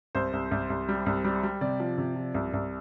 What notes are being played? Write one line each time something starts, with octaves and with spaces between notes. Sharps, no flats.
C2 C5
C2
C2
C2
G3
C2
G3
G3
C3 D5
F3
C3
F3
C2
C2